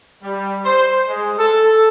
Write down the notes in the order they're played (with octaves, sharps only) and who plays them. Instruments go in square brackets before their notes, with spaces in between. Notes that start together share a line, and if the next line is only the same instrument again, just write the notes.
[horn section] G3
C5
G#3
A4